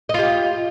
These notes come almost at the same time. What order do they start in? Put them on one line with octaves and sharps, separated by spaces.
D#5 F4 G4